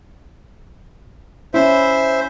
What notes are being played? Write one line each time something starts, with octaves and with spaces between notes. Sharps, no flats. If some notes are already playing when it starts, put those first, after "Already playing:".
C#4 E4 C5 E5